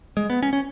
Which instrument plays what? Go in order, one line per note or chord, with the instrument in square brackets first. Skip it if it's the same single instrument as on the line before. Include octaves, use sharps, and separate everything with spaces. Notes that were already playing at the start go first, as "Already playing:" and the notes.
[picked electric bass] G#3
B3
C#4
C#4